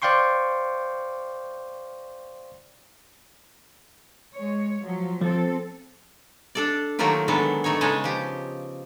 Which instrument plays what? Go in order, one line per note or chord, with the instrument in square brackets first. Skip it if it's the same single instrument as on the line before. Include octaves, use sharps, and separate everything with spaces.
[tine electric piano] C5 D5 F5 G5 C6 C#6
[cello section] G#3 C#5
F3 F#3
[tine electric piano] F3 [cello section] C4 A4
[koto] D4 A4 D5
D#3 F#3 A3 A#3 F4 G4
D3 D#3 F#3 G#3 B3 A4
D3 A3 D#4 C#5
C#3 G#3 D#4 C#5 D#5 A5
F3 G4